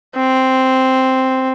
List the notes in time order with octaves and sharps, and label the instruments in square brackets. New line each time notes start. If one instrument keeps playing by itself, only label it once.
[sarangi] C4